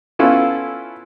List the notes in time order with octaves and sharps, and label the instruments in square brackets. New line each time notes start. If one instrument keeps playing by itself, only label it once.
[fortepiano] B3 C#4 E4 F4 A4